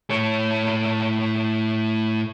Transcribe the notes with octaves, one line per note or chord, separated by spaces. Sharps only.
A2 C#5